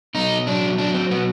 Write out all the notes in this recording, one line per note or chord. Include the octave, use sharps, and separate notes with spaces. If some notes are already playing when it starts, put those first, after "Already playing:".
B2 D#4
F#3 D4
F#3 D4
C4
B2 B3